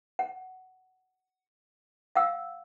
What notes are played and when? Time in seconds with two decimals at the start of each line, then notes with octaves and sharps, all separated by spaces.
0.19 F#5
2.15 F5 F#5 E6